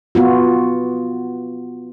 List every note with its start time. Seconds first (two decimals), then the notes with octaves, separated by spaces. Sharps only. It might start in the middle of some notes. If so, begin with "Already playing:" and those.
0.15 B3 F4 F#4